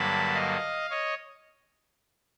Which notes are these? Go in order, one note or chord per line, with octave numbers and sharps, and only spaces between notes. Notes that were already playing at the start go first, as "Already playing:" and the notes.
Already playing: G2 D3 F#3 A#3 A5 B5
D#5 F5
C#5 D#5